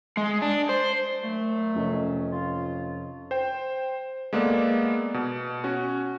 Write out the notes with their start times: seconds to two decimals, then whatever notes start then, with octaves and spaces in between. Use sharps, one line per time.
0.17 G#3
0.42 D4
0.69 C5
1.24 A#2 F#3 A3
1.75 F1 C#4 D#5
2.33 F4
3.31 C5 G5
4.33 G#3 A#3 B3 A4 D5
5.14 B2
5.64 C#4 F#4